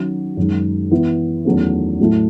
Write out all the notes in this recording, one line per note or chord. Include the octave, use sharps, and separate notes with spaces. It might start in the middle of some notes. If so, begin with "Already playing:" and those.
Already playing: D#3 F#3 C#4 F#4
F#2 D#3 G#3
E3 B3 E4
E2 D#3 F#3 A3 C#4
A2 F#3 A3 E4